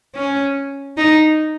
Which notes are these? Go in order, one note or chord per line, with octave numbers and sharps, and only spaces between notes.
C#4
D#4